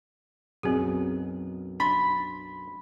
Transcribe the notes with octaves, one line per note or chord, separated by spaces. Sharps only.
B1 F#2 B2 C4 G#4
D4 B5 C6